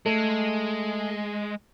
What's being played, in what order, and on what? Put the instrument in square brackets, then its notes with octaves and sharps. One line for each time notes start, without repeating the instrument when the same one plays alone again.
[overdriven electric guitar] G#3 [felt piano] A3